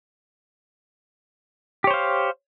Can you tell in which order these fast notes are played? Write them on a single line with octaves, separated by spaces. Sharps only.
G4 C#5 C5 F5